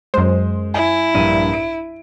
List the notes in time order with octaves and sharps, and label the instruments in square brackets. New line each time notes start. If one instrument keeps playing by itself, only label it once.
[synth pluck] F#2 C5 [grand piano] G#3
[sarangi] E4 [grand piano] G#5
[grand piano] A#1 G2 D#7
D7